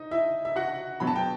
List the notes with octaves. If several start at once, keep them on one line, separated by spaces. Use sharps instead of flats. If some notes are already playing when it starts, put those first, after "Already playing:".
Already playing: D#4 D#5
E4 E5
E5
F#4 F#5
B2 F#3 B3 B5
A5
G5